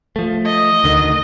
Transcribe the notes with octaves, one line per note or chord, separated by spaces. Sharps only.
F3 A3
D#5
D2 D3 D#3